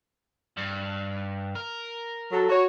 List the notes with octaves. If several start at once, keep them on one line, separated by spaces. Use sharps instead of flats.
G2
A#4
F#3 A4
F#4 C#5